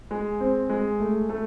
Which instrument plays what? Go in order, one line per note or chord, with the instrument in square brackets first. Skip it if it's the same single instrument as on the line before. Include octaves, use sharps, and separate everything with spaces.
[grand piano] G#3
C4
G#3
A3
A3